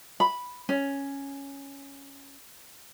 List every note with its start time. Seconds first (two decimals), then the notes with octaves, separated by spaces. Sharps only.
0.20 B5
0.69 C#4